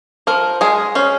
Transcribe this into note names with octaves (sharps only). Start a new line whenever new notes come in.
F3 A#4
G#3 G#4
C#4 C5